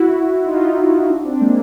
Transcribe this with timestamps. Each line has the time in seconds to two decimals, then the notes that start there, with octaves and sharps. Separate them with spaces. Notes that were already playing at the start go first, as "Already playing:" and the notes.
Already playing: E4 F#4
0.46 D#4 F4
1.09 D4 E4
1.25 C4 D4
1.40 G#3 A#3